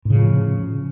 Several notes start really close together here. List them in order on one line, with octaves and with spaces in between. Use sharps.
A2 C#3 F3